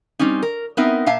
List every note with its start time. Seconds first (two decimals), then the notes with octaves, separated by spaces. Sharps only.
0.19 G3 C4 C#4 D#4
0.42 A#4
0.77 B3 C4 D#4 A#4 E5
1.06 A#2 E5 F5 A5